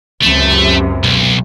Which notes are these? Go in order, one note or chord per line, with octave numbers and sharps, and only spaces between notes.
C#2 F#2 C3 A3
B1